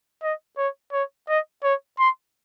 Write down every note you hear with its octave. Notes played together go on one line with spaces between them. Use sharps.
D#5
C#5
C#5
D#5
C#5
C6